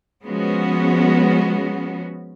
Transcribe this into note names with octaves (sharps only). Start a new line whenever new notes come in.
F3 G#3 B3 C#4 F#4